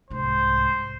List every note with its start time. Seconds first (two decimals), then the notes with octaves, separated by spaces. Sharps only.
0.10 C2 G#2 C5